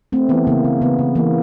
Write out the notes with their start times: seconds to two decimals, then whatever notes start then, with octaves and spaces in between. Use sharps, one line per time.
0.12 A3 C4
0.29 E3 B3
0.47 C#3 A#3
0.64 C#3
0.81 C#3 B3
0.99 C#3
1.15 E3 A#3